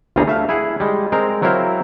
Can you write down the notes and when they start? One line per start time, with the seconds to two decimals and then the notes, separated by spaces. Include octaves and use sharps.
0.16 G1 D2 G2 G3 G#4 A#5
0.28 A3 E5 F5
0.49 E4 G#4 F#5
0.80 G3 G#3
1.12 G#3 C4 A#4 A#5
1.42 F#3 C4 E4 A#4 C5 F5